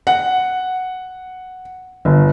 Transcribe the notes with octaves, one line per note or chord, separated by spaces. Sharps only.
F#5
G1